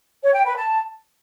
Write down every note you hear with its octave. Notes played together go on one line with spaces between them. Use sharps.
C#5
G5
B4
A5